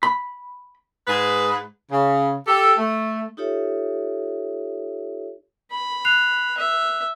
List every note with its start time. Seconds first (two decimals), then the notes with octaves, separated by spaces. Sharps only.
0.03 B5
1.08 G#2 G#4 B4
1.91 C#3
2.47 G4 A4
2.78 A3
3.37 D#4 F4 G4 A4 C#5 E5
5.71 B5
6.05 F#6 C7 F7
6.57 E5